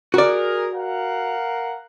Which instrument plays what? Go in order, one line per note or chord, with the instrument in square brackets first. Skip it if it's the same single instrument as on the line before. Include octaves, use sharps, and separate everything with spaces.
[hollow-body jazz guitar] F#4 D5 [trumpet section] G#4 A#4
[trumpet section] A#4 F5 F#5